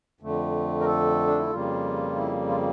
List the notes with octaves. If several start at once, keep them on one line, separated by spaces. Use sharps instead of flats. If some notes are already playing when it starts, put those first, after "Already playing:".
F2 D3 A3
A#4
A4
D4
E4
F2 C#3 G3 A#3 F4
E4
F4